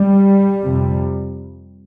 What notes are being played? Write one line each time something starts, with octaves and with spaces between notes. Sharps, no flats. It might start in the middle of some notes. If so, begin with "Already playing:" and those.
Already playing: G3
F2 C3